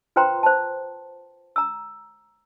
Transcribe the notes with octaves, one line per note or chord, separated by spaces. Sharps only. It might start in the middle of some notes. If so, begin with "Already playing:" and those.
F4 B4 C5 G5 A#5 C6
C5 A5
A#5 E6